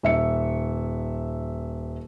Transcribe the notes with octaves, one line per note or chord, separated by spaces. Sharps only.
D#1 E5 C#7